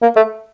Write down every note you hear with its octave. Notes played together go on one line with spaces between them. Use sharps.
A#3
A3